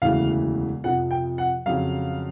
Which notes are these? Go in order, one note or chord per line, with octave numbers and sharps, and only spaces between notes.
E1 D2 C#3 E3 F5
F2 C3 F3 F#5
G5
F#5
F2 C#3 F#3 F5